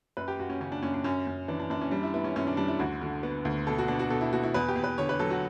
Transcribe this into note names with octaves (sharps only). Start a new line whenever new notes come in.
F#2 B4
G4
F#2 F#4
C#4
C#3 C#4
D4
F#2 C#4
D4
F#2 C#4
F#2
E3 D4
D4
F#2 D4
C#4
G3 D4
E4
B3 E4
C#4
F#2 C#4
D4
G3 D4
E4
D2 F#4
D3
B3
D2
B2 A4
F#4
B2 D4
F#4
B2 A4
E4
B2 F#4
E4
E2 B4
G4
E2
B4
D3 C#5
B4
F#3 A4
F#4